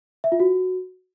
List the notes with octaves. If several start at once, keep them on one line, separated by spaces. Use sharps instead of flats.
E5
F4
F#4